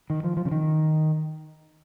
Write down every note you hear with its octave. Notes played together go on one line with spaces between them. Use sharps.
D#3
F3
F3
C#3
D#3